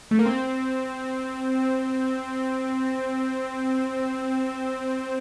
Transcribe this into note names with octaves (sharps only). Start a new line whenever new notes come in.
A3
A#3
C4